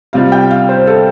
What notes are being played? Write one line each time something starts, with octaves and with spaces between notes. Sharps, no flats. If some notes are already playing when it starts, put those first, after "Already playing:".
C3 G3 F4 F5
G5
F5
C5
A4